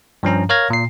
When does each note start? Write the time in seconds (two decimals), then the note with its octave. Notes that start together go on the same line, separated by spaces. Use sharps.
0.23 G2 F3 C#4 A#5
0.49 A#4 C#5 F5 F6 G#6 A#6
0.70 A#2 C7